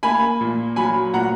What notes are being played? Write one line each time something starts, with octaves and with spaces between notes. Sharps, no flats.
A#3 G#5 B5
A#2
F#3 G#5 B5
A#2 F#5 A#5